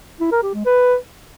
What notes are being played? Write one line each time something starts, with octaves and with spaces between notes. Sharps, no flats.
E4
A#4
G4
G#3
B4